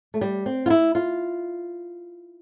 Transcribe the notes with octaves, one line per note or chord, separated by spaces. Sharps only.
A3
G3
C4
F4
E4
F4